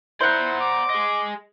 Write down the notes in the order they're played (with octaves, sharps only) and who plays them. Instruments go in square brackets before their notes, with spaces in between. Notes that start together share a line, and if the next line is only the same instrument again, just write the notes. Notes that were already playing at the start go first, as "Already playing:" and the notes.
[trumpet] E4 [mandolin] C5 F#5 [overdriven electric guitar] D5 A#5
[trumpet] D6
[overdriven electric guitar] G#4 D#5